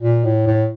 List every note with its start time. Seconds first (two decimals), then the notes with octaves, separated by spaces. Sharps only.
0.02 A#2
0.24 A2
0.47 A2